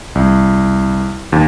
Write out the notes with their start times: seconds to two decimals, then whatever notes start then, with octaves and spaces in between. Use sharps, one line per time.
0.15 C2
1.32 D#2